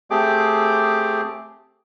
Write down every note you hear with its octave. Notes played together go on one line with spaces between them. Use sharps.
A3 C4 G4 G#4 D6